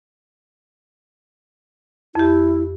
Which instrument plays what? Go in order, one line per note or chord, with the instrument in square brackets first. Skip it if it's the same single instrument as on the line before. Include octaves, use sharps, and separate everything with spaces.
[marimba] F2 G4 [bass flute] E4